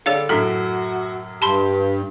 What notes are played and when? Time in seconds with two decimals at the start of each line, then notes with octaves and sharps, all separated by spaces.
0.06 D3 G3 G#4 A4 C#5 F5
0.29 F#2 A2 D4 F#4 A4
1.42 G2 G4 A5 B5 C6